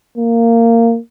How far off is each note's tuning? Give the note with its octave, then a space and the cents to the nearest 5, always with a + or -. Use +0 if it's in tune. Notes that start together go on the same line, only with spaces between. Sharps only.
A#3 -15